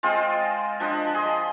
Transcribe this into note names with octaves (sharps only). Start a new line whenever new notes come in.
G#3 C4 F4 D#5
F3 D4 D#5
G#4 D#5 C6